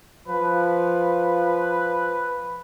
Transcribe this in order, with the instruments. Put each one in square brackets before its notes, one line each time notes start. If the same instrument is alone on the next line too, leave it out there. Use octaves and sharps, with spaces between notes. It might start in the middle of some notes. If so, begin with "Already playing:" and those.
[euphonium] F3 [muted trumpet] B4